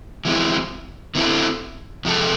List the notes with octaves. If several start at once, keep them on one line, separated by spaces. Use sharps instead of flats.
E3 G#3 C4 E4
D3 A3 C4 E4 A4
F2 C3 G#3 D4 A4